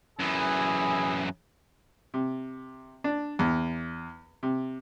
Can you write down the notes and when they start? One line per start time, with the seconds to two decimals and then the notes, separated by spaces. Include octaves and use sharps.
0.19 F#2 E3 E4 G#4
2.14 C3
3.04 D4
3.39 E2
4.43 C3